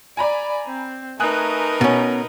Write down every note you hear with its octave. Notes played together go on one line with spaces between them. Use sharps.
D5 G#5 A#5 B5
C4
A3 D#4 A#4 B4 G#5 D#6 F#6
B2 C#4